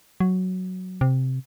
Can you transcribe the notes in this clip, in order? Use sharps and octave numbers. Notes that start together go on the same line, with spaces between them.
F#3
C3